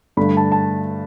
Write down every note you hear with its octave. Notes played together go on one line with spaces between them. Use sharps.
G2 D3 A3 B5
A5
A5